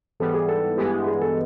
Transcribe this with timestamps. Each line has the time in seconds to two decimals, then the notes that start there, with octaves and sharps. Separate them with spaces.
0.20 G#2 E3 G3 B3 A4
0.34 G#4
0.49 A4
0.78 G2 E3 G#3 B3 G4
1.07 G#4
1.22 A4